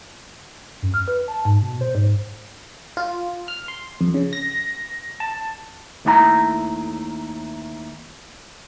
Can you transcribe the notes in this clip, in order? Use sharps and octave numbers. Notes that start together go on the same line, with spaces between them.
F#2
F6
B4
A5
G#2
B2
C5
G#2
F4
F6
C6
F2
C#3
A#6
A5
D#2 A3 E4 F#5 A#5